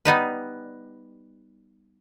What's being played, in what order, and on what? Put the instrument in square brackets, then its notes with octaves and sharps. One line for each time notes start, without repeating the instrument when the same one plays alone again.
[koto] G3 B3 D#4 B4